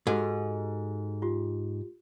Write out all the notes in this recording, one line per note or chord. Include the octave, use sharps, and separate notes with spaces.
G#2 F#4 G4 A4
F4 G4